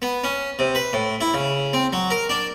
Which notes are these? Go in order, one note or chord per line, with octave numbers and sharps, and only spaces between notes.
B3
C#4
C3
B4
A2
E4
C#3
C4
F#3
A#4
D4